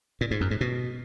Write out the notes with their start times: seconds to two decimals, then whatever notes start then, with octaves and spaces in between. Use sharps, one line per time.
0.21 A#2
0.31 G#2
0.41 F#2
0.51 G#2
0.61 B2